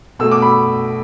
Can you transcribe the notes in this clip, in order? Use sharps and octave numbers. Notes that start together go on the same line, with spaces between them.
B2 A3 E6
D6
B5